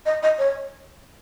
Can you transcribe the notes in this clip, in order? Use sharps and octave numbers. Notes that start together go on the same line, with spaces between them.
D#5
D#5
C#5